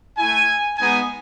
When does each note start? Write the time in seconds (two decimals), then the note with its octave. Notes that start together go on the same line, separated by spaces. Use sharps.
0.18 A3 E4 G#5
0.78 G#3 B3 D#4 G#5